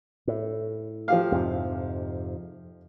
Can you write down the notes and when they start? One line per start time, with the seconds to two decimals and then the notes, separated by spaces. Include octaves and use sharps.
0.27 A2
1.08 F3 G4 F5
1.32 F2 G#2 C3